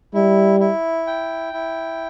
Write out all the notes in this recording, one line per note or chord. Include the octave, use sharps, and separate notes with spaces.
G3 E4
E4
G5
E4